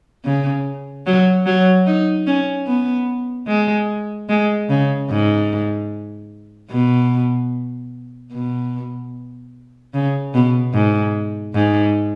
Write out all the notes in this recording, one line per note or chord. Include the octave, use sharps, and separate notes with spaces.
C#3
F#3
F#3
D#4
C#4
B3
G#3
G#3
C#3
G#2
B2
B2
C#3
B2
G#2
G#2